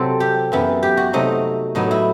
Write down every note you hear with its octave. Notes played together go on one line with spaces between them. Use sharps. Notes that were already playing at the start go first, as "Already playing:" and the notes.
Already playing: C3 F#3 C4 A4
G4
F#2 E3 B3
G4
F#4
C3 F#3 A3 D#4
A2 F#3 B3 D#4
E4